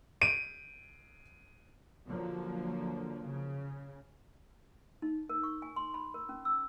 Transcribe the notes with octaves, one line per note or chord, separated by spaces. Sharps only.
D7 D#7
D3 F3 F#3 A#3
C#3
D#4
A#4
C#6
G#5
C6
B5
A#4
C#4
E6